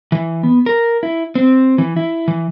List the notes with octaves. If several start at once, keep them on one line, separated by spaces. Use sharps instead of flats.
E3
B3
A#4
E4
C4
E3
E4
E3